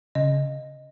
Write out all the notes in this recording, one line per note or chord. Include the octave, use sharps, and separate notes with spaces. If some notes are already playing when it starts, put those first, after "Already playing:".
C#3 D#5